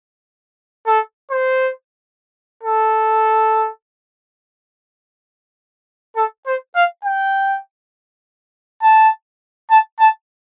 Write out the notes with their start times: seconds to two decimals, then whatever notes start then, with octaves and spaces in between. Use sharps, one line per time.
0.86 A4
1.31 C5
2.63 A4
6.16 A4
6.46 C5
6.76 F5
7.04 G5
8.82 A5
9.70 A5
9.99 A5